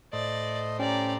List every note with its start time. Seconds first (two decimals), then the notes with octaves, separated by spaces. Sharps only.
0.13 A2 C5 D5 D#5
0.79 C#4 G4 D5 A#5